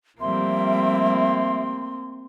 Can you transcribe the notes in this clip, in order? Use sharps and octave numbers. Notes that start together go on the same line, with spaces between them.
F3 G3 A3 A#3 C4 E5 C6